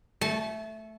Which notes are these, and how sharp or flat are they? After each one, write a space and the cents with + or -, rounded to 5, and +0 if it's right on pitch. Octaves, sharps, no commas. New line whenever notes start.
A3 +0 A5 -40